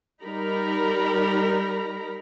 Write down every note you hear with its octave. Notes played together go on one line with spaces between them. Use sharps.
G3 D#4 A#4 A#5 B5